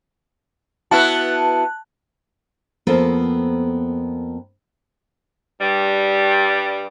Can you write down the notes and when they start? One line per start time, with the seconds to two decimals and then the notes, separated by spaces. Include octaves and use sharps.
0.91 B3 E4 F#4 A5 F#6
2.87 F2 A#3 B3 F4 A4 C5
5.61 G2 G3